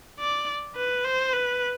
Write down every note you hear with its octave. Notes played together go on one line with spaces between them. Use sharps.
D5
B4
C5
B4